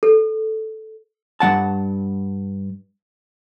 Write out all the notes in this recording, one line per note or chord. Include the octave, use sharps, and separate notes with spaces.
A4
G2 F#3 F#5 A5